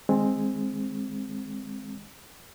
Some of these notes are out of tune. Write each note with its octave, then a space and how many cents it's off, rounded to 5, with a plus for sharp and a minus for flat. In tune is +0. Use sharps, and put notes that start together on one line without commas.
D#3 -10 G#3 +0 C4 +10